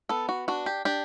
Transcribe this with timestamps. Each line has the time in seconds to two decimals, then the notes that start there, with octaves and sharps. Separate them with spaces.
0.09 B3 A4
0.29 F#4
0.48 D4 F#4
0.66 G4
0.85 D4 G4